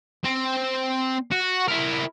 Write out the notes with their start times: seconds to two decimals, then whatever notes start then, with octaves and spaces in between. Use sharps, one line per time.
0.24 C4
1.32 F#4
1.69 E4 A#4